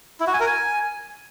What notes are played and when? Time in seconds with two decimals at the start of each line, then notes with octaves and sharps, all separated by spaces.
0.20 E4
0.27 F#4
0.34 G#5
0.40 A#4
0.47 G#5